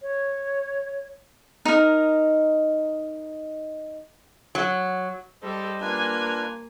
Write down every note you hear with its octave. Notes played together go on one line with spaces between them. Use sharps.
C#5
D#4 A#4
F#3
G3 A4 C5 D#5
A#3 D4 F4 B4 G#5